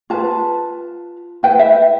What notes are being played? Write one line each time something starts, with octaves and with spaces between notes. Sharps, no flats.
F4 B4 A5
E4 B4 G5
E5